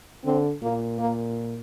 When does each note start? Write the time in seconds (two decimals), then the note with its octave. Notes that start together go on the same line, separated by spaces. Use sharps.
0.25 D3 C4
0.62 A#2 A#3
0.99 A#3